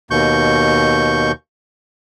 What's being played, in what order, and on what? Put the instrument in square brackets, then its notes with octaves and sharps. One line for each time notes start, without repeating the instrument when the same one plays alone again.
[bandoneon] D#2 B2 C#6 G6